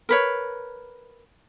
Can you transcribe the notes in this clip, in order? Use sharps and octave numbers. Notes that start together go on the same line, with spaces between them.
A#4 B4 C#5